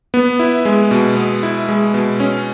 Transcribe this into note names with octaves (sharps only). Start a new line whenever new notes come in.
B3
E4
G#3
B2
B3
E4
G#3
B2
C#4